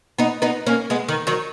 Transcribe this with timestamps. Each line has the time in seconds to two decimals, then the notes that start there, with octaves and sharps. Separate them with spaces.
0.18 B3 D#4
0.42 B3 D#4
0.67 A#3 C#4
0.90 G#3 B3
1.09 D#3
1.27 D#3 F#3